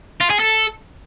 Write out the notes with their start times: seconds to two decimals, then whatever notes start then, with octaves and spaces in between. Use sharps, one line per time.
0.21 F4
0.30 G#4
0.40 A4